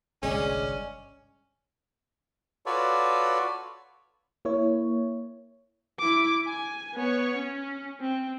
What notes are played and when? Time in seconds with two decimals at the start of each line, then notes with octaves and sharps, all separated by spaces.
0.23 G1 C2 G#3 C#4 C#5 D5
2.66 F4 F#4 A4 B4 C#5 D5
4.45 A#3 E4 C#5
5.99 E4 D6
6.47 G#5
6.95 B3 C#5
7.36 C#4
8.01 C4